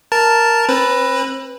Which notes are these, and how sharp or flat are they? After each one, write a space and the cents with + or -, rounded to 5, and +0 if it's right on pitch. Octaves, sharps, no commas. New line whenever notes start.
A#4 +0 A5 +0
C4 +35 B4 +0